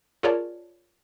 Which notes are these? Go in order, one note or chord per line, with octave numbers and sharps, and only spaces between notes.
F4 G#4 A#4 C#5 D5 A5